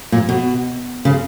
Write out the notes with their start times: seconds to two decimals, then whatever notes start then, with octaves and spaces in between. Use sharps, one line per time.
0.12 A#2
0.29 B2
1.05 C#3